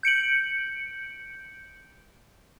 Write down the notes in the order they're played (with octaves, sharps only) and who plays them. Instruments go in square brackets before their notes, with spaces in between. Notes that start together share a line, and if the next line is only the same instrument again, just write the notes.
[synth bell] G6 C#7 D7 F#7